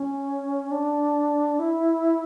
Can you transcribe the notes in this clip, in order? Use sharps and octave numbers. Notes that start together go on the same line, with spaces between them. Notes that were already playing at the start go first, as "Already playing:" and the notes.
Already playing: C#4
D4
E4